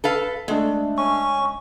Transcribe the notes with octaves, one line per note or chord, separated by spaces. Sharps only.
A4 B4 F5
G#3 A3 D4
C#4 C#6